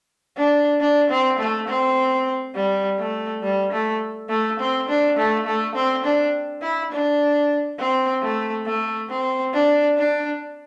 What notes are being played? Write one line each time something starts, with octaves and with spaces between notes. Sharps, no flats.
D4
D4
C4
A3
C4
G3
A3
G3
A3
A3
C4
D4
A3
A3
C4
D4
E4
D4
C4
A3
A3
C4
D4
D4